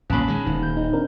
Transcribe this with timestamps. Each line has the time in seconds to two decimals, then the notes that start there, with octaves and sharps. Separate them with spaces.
0.10 B1 A#2 C#4 A5 B5
0.28 D#3 G#3
0.46 D#1 D#3
0.63 G6
0.77 D#4
0.93 C4 D4 A#4